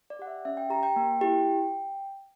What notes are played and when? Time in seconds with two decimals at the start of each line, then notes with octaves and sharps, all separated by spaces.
0.10 D5
0.19 G4 F#5
0.27 E5
0.45 C#4 E5
0.57 G5
0.70 G4 A#5
0.83 G5
0.96 A#3
1.21 E4 G4